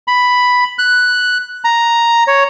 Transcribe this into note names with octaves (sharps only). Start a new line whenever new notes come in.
B5
F#6
A#5
C#5